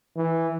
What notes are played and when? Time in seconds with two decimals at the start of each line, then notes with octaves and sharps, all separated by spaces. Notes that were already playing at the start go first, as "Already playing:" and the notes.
0.16 E3